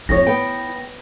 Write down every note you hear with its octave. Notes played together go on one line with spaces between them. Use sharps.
F2 E4 C#5 A#6
B3 G5